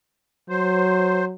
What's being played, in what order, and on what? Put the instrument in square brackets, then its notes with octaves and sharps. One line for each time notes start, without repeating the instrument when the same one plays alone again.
[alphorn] F#3 [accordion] C5